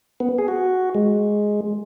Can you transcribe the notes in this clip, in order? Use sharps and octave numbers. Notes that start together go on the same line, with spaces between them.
B3
G#4
F#4
G#3